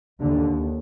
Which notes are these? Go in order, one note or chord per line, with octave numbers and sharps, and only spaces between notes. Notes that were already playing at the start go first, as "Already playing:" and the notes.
D#2 D3